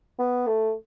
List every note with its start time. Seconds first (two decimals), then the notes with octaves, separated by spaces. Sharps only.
0.19 B3
0.47 A3